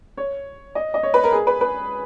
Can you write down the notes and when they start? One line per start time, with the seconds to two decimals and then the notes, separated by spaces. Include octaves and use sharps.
0.17 C#5
0.75 D#5
0.94 D#5
1.03 C#5
1.14 B4
1.24 A#4
1.32 G#4
1.47 B4
1.61 B4